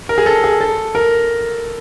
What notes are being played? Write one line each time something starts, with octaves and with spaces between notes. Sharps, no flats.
A#4
G#4
A4
G#4
A4
A#4